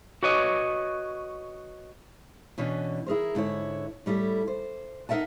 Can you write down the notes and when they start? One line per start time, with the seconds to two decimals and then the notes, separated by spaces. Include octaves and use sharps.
0.23 F#4 B4 C#5 D#5
2.58 B2 E3 C#4 D4
3.06 E4 G#4 A#4 C5
3.35 G#2 D3 E4 C#5
4.06 A2 G3 E4 A4
4.47 C5
5.09 D#4 A#4 E5 F#5 A5